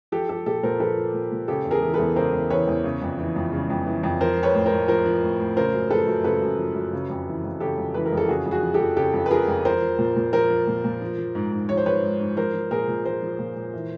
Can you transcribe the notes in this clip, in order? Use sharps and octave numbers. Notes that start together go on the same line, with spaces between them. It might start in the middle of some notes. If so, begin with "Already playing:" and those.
F3 G4 A4
F3 G4 A4
A#2 G4 A4
A#2 A#4 C5
F3 A4 B4
F3
A#2
A#2
C#3 G4 A4
E2
G#4 A#4
E3
A4 B4
E2
C#3 A#4 C5
E2
E3 B4 C#5
E2
C#3
F2
E3
F2
C#3
F2
E3
F2
F3 A#4 C5
F3
B4 C#5
A2
A#4 C5
A2
F3 A#4 C5
F3
A2
A2
C#3 A#4 C5
F#2
F3 A4 B4
F#2
C#3 A4 B4
F#2
F3
F#2
C#3
F2
E3
F2
C#3 G4 A4
F2
E3 B4
A#4
F2
A4
C#3 F#4 G#4
F2
F#4 G#4
F3
G4 A4
F2
C#3 G4 A4
F2
B4
F3 G#4 A#4
F2
F3 A#4 C5
F3
A#2
A#2
F3 A#4 C5
F3
A#2
A#2
F3
F3
G#2
G#2
F3 C#5
C5
F3 B4 C#5
G#2
G#2
F3 A#4 C5
F3
A#2 G#4 A#4
A#2
F3 A#4 C5
F3
A#2
A#2
E3